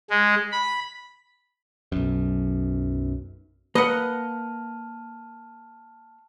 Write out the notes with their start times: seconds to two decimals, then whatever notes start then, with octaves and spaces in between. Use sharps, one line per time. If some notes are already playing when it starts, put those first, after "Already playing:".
0.10 G#3
0.52 B5
1.92 B1 F#2
3.75 A#3 B4 D#5 F#5 A5 F6